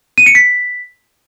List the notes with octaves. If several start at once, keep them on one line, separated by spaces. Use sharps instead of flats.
D#7
C#7
B6